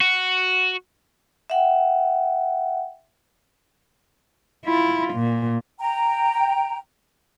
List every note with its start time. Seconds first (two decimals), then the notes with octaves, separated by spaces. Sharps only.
0.01 F#4
1.50 E5 F#5 G5
4.66 E4 F4
5.13 A#2
5.79 G5 A#5